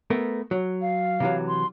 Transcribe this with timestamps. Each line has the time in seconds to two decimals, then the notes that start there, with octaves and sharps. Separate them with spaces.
0.10 A3 B3 A#4
0.51 F#3
0.82 F5
1.20 C3 E3 F#3
1.48 C6